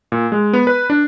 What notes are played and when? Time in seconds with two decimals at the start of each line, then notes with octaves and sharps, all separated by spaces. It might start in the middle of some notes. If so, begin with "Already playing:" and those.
0.12 A#2
0.32 G#3
0.53 B3
0.67 B4
0.90 D4